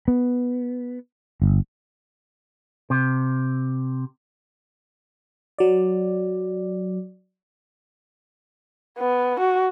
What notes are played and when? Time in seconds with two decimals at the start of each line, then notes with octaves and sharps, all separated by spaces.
0.08 B3
1.42 G1
2.90 C3
5.59 F#3 D5
8.99 B3
9.40 F#4